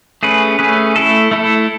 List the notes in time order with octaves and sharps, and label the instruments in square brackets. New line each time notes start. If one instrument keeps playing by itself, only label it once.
[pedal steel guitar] A3 C#4 G#4 B4
A3 C#4 G#4 B4
A3 E4 A4
A3 E4 A4